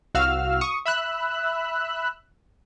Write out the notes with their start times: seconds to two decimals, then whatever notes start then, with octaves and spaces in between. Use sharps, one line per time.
0.15 C2 F#4 F5 E6 F6
0.61 C#6 D#6
0.86 E5 B5 E6 F#6